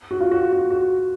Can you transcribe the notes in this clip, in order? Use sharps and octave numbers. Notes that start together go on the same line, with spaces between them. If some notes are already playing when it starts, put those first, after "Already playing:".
F#4
F4
F#4
F#4
F#4